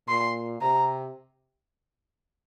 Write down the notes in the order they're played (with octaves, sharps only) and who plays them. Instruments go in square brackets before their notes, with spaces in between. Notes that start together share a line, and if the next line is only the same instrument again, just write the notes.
[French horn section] A#2 [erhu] C6
[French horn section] C3 [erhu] A#5